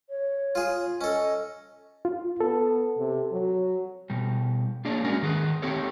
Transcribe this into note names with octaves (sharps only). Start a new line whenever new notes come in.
C#5
F4 G#4
C#4 A4 D#5
F4
B3 A4
C3
F#3
B2 G3
A#3 D4 G#4 C#5 D5
G#3 C#4 F#4 A#4
D#3 G#4 B4
C4 G4 A4 C#5